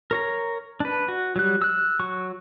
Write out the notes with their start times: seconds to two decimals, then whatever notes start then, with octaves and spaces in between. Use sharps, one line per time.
0.11 A#4 C#5 A#5
0.80 D4 B4
1.08 F#4
1.36 F#3 G3 F#6
1.62 E6 F#6
1.99 F#3 C#6